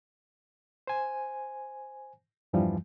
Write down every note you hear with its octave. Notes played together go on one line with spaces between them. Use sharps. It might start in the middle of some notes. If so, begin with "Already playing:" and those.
C5 G#5
E2 G2 E3 F3 G3